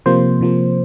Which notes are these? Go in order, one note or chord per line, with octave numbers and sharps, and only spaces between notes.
C3 F3 A#3 C5
C3 F3 A#3